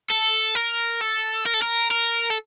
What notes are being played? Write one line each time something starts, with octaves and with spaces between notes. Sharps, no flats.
A4
A#4
A4
A#4
A4
A#4
A#4
A4